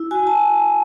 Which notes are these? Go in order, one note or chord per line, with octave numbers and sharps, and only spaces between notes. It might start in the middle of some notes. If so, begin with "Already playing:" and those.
Already playing: E4
F#4 G#5
A5